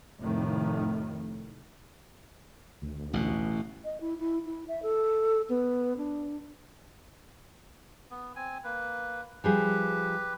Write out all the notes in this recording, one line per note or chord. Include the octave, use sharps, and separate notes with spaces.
F1 A2 D#3
D2
A1 B2
D#5
E4
E4
E4
E5
A4
B3
D4
B3
C4 G#5
A#3 B4
F3 G3 G4 G#4 B4